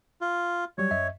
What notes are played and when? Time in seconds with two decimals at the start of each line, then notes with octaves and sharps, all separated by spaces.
0.21 F4
0.78 F#3 G3 C#5
0.91 F#2 D#5 E5